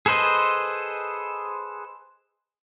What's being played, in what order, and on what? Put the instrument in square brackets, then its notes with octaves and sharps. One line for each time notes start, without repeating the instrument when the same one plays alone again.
[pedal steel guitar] G#4 A4 B4 C5 D#5